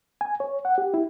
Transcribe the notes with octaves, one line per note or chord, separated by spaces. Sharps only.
G#5
C#5
F#5
G4
E4